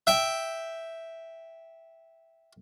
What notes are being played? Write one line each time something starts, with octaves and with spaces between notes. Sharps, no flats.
E5 G5